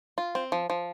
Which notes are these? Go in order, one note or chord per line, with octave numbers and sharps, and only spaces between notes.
F4
C4
F3
F3